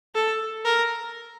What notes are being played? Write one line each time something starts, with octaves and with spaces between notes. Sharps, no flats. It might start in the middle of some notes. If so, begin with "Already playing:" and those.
A4
A#4